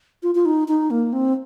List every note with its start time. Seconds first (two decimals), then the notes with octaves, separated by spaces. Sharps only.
0.23 F4
0.35 F4
0.45 D#4
0.68 D#4
0.91 A#3
1.13 C4